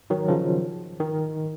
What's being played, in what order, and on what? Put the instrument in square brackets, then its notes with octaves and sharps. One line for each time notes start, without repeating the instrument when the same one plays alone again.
[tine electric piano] D#3 F#3
C#3 F3
D#3